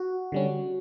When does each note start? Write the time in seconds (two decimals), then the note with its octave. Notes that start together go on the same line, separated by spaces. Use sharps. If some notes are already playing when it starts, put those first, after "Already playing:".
Already playing: F#4
0.32 D3 G3 C#4